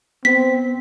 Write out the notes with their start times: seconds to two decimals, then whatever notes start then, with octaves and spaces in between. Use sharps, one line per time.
0.25 B3 C4 B6